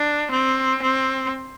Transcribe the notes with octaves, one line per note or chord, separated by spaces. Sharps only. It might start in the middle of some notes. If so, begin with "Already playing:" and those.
Already playing: D4
C4
C4